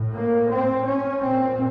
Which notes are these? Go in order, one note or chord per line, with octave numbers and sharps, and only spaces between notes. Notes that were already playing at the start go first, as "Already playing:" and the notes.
Already playing: A2
A#3
C4
C#4
A#2 C4